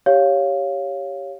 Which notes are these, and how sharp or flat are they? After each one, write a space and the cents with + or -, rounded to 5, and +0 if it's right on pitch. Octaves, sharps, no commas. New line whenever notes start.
G4 +0 C#5 +0 F5 +0